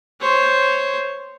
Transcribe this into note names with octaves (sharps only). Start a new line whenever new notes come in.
C5 C#5